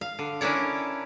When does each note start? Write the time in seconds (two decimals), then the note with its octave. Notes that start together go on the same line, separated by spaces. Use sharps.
0.01 F5
0.19 D3
0.41 C#4 D4 E4 A#4 C#5 D5